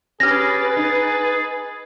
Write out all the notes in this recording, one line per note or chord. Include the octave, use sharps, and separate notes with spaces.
C#4 G4 G#4 B4 F6 A6 A#6
D#4